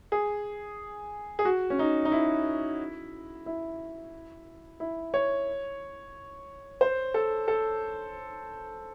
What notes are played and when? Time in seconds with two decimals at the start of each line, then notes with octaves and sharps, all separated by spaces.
0.12 G#4
1.39 G#4
1.45 F#4
1.70 C#4
1.79 D#4
2.05 D#4
2.12 E4
3.46 E4
4.80 E4
5.14 C#5
6.81 C5
7.14 A4
7.48 A4